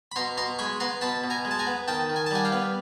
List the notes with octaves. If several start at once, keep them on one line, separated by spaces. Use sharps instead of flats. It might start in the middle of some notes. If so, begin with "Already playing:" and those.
B5
B2 A#5 C6
B2 A#5 C6
G#3 B5 C#6
B3 A#5 C6
B2 A5 B5
B2
G#5 A#5
G#3
A5
G#5 A#5
B3
D#3 G5 A5
D#3
G#5
A5
G3 F#5 G#5
F5 G5
B3